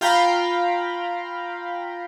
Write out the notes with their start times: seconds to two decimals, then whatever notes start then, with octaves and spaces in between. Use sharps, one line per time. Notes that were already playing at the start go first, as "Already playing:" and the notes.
0.01 F4 F5 G5 A#5 B5